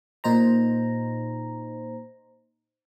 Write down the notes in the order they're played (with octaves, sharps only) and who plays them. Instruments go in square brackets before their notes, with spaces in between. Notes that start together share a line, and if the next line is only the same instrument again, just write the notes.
[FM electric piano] A#2 D#4 C5 A#5